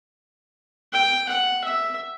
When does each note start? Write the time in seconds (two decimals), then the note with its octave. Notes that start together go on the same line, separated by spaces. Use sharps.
0.93 G5
1.29 F#5
1.65 E5